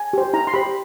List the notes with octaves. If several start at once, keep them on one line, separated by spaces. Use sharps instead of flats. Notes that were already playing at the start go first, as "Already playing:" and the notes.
Already playing: G#5
G4 C5
E4 A#5
C6
G4 C5 B5